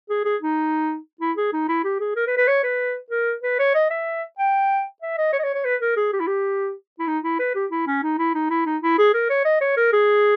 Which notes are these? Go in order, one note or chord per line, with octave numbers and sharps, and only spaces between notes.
G#4
G#4
D#4
E4
G#4
D#4
E4
G4
G#4
A#4
B4
B4
C#5
B4
A#4
B4
C#5
D#5
E5
G5
E5
D#5
C#5
D#5
C#5
C#5
B4
A#4
G#4
G4
E4
G4
E4
D#4
E4
B4
G4
E4
C#4
D#4
E4
D#4
E4
D#4
E4
G#4
A#4
C#5
D#5
C#5
A#4
G#4